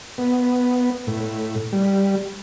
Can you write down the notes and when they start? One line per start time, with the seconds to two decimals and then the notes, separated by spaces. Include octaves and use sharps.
0.18 B3
1.07 A2
1.72 G3